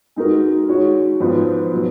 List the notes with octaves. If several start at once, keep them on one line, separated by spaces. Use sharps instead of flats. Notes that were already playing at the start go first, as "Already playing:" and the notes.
G#3 D#4 F#4 A#4
G#3 D#4 F#4 C#5
G#2 F3 B3
B2 F#3 B3